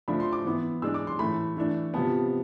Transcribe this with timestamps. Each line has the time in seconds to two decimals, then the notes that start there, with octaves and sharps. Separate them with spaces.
0.08 F3 A3 D4 B5
0.20 C6
0.33 D6
0.45 E3 B3 E4
0.82 E3 G#3 D4 E6
0.94 D6
1.07 C6
1.19 A2 E3 A3 B5
1.57 E3 A3 D4
1.94 C3 F3 B3 A5